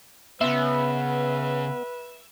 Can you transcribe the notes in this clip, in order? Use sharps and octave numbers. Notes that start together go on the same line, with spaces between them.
C#3 B3 B4 E5 C6